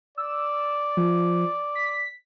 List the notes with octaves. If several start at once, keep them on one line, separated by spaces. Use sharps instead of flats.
D5 E6
F3
B6